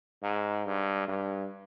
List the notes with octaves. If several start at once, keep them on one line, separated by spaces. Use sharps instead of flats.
G#2
G2
G2